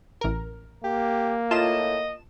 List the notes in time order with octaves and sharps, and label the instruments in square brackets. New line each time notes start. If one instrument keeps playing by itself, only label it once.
[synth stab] A1 A#4
[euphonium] A#3 [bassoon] G4
[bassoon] A2 [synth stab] F4 A5 E7 [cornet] D#5